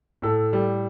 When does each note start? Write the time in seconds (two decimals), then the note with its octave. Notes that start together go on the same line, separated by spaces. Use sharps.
0.22 A2 A4
0.53 G3